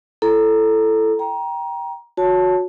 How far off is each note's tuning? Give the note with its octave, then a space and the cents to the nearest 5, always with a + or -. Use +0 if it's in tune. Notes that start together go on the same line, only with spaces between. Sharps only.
E4 +25 A4 +0 A#5 +0
G5 +0 A#5 +20
F#4 -20 C#5 +15 A5 +0